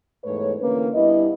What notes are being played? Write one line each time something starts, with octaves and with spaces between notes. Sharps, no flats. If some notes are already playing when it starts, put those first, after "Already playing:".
E2 G#2 A3 B4 C#5
E2 D3 A#3 C#4 B4
G2 B3 E4 D#5